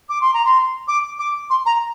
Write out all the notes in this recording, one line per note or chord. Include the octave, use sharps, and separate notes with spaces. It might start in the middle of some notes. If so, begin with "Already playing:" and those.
D6
C6
A#5
C6
D6
D6
C6
A#5